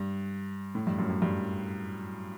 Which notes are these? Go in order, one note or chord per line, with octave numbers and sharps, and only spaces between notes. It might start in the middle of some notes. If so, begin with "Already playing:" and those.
Already playing: G2
A2
G2
F#2
F#2
G2